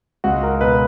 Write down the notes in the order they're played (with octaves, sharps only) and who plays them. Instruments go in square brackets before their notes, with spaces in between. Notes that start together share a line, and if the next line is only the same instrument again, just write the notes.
[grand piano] C#2 F#4
A#4
B2 B4